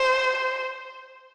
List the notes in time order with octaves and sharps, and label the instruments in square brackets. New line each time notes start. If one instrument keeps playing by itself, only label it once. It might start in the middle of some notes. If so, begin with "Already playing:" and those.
Already playing: [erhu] C5